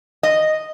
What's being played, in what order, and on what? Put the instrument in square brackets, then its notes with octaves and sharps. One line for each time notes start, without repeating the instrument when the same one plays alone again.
[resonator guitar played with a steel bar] D#5